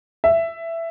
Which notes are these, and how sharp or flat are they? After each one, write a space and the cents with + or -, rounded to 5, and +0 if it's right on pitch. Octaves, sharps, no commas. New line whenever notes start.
E5 +10